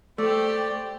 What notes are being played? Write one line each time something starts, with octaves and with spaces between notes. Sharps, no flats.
A3 G4 C5 D5